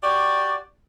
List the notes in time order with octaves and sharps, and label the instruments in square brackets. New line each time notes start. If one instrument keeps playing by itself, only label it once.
[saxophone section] F#4 G4 D5